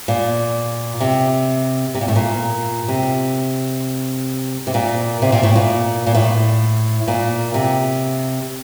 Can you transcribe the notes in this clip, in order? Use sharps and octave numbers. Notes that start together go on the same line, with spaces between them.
A#2
C3
C3
A#2
A2
A#2
C3
C3
A#2
C3
A#2
A2
A#2
A#2
A2
A#2
C3